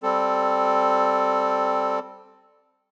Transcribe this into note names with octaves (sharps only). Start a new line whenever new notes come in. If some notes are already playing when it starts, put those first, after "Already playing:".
G3 C4 A4